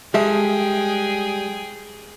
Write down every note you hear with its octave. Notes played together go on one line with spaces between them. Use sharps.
G3 G#3 G#4 A4 E5 G5